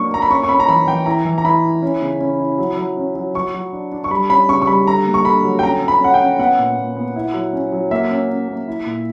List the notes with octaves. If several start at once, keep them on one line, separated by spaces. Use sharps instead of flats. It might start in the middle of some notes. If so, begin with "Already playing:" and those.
Already playing: F#3 A#3 D4 C#6
A#3 A#5
B5
C#4 C#6
C#6
C#4 B5
A#5
E3 B5
E3 G5
E4 A#5
E3
A#5
E4 B5
E4
C#4
C#3
C#4
E4
F#3
F#3
C#4
F#3
F#3 C#6
F#3
D4
D4
C#6
G3 B5
C#4 B5
C#3 C#6
C#6
G3 B5
D3 A#5
A#3
C#6
D3 B5
F#3
G5
C#4 A#5
C#4
B5
C#4 F#5
G5
C#4
B3 F#5
A#2
A#2
B3
E4
F#3
C#4
F#3
A#3 E5
C#4
C#4
A#3
E4
A#2